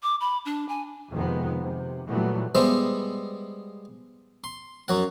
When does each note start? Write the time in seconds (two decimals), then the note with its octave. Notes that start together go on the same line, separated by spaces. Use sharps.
0.03 D6
0.20 B5
0.45 D4
0.69 G#5
1.12 F2 C3 D#3 G#3 B3
1.61 C3
2.09 A#2 E3 F#3 G3 A3 B3
2.55 G3 G#3 B3 C5 E5
4.44 C6
4.88 F#2 F#3 F#5